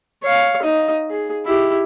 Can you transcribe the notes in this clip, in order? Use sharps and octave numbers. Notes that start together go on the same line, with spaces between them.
C#5 F5
D#4 D#5
G#4
E4 G4